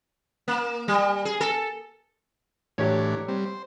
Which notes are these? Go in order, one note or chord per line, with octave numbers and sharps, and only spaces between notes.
A#3
G3
G#4
A4
A2 E3 F#3 D4 G4 C#5
G3 C4
C5